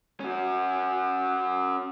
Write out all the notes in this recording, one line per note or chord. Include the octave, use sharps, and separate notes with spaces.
C#4 F#4